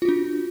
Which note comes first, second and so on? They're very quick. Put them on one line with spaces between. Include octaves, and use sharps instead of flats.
F4 F#4 D4